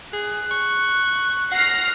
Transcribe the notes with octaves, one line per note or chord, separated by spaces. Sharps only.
G#4 F#6
C#6
F#5 F6 A#6 C7